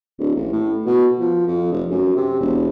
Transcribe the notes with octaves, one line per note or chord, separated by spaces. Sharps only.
D1
A1
A2
B2
F3
F2
F1
F#2
C3
E1